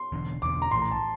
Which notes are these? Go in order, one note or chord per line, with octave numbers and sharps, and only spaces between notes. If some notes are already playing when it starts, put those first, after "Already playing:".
Already playing: C6
E1 E2 D3
E1 E2 D3 D6
A#5
A#1 A2 E3 A3 C6
A#5
A5